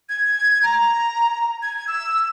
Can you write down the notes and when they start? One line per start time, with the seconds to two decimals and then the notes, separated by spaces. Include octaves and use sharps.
0.09 G#6
0.63 A#5
1.62 G#6
1.88 E6